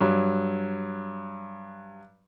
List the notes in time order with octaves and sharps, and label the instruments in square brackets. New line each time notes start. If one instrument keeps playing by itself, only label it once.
[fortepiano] G2 F#3